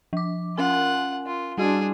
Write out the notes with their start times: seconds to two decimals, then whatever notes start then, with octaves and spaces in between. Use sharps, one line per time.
0.13 F3 D6
0.58 C#4 F4 A#4 F#5 G#5
1.26 F4
1.58 G3 D4 F#4 G#4 C6